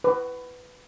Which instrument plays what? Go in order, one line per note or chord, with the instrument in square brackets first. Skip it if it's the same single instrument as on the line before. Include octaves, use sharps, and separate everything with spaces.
[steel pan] B4